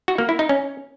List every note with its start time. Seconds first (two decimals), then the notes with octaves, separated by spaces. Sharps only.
0.08 F#4
0.18 A#3
0.29 E4
0.39 D#4
0.49 C#4